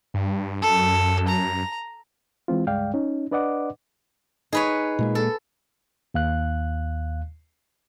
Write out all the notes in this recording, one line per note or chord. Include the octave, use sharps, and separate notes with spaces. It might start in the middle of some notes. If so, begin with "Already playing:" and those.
G2
F#2 A4
A#5
E3 G#3 C4 F4
C#2 G2 G#3 D5 F5 G5
C#4 D#4
D4 B4 D5 D#5 F#5 D6
D#4 G#4 B4 C#5
A#2 G#3 A#3
A4
D#2 F5 F#6